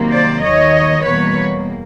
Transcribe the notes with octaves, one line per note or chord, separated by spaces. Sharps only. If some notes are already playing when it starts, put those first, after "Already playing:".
Already playing: C3 D#3 F#3 A#3
C5 D5
D#2 D#3 F#3 C#5 D#5
E2 B2 G3 A#3 B4 C#5